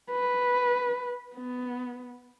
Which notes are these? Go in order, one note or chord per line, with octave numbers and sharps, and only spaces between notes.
B4
B3